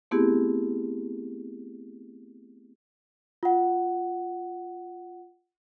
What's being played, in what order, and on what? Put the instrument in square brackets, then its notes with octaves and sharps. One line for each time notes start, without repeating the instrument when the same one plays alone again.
[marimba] A3 B3 C4 E4 G4 G#4
[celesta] F4 F#5